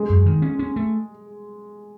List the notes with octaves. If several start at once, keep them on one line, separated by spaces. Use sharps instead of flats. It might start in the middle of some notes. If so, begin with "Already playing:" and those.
Already playing: G#3
F#2
D#3
C#4
C#4
A3